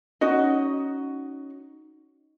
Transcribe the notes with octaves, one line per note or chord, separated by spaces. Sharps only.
C#4 D#4 F#4 D#5